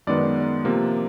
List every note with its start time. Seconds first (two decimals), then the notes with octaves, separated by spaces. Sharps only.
0.07 F#2 D#3 G#3 B3 D5
0.65 C3 F3 A#3